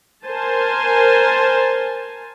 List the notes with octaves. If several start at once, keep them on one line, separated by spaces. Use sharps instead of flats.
A#4 C5 G#5 A5